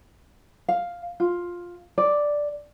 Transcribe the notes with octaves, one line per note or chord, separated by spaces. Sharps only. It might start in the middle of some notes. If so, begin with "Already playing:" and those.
F5
F4
D5